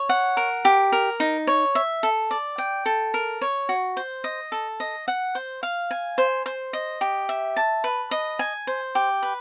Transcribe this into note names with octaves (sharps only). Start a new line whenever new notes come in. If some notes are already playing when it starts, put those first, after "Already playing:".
Already playing: C#5
F#5
A#4
G4
A#4
D#4
C#5
E5
A4
D5
G5
A4
A#4
C#5
F#4
C5
D#5
A4
D#5
F#5
C5
F5
G#5
C5
C5
D#5
G4
E5
A5
B4
D#5
G#5
C5
G4
B4